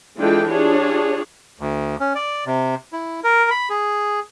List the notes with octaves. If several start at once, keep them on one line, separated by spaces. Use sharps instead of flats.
E3 G#3 D4 F4 A4 G5
D4 F4 G4 G#4 C#5
D2
C#4
D5
C3
E4
A#4
B5
G#4